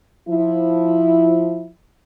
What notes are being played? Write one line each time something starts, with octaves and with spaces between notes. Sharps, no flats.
F3 E4